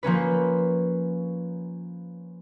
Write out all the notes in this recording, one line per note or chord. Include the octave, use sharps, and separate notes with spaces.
F3 A#3 C#4 B4